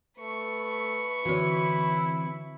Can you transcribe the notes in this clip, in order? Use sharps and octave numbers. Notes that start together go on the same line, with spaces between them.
A3 B4 C#6
D3 E3 C4 E4 F#4 C#5